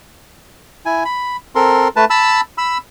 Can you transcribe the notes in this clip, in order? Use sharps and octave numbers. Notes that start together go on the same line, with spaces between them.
E4 G#5
B5
C4 A4 A#4 C6
A3 B4 A5
A5 B5 E6
B5 E6